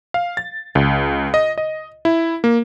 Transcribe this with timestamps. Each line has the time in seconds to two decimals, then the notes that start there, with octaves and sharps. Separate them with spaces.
0.14 F5
0.37 A6
0.75 C#2
1.34 D#5
1.58 D#5
2.05 E4
2.44 A#3